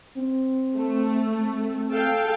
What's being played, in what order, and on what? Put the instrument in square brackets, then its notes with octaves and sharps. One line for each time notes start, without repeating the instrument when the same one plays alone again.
[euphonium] C4
[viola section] A3
[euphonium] C4
[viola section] A4 F5 G5